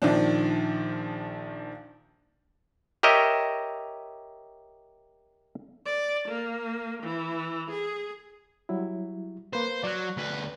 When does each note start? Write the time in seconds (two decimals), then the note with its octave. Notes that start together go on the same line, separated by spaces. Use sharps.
0.02 A#1 D#3 F3 D4
3.03 G4 A#4 C#5 D#5 E5
5.86 D5
6.28 A#3
7.03 E3
7.70 G#4
8.69 F#3 G3 E4
9.53 A#3 B4 C5
9.84 F#3 D5 F#6
10.17 D2 B4